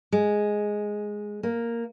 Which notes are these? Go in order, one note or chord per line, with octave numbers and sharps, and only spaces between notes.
G#3
A#3